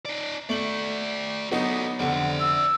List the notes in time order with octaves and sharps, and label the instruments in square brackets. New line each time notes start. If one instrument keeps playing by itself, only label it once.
[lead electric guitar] D#4 D5
[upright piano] A3 F#7 [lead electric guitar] F#4 D5
[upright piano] F#3 B3 D#4 [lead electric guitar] F#4 A4
[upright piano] F1 D3 [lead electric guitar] C5 D5 [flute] F#5
[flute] E6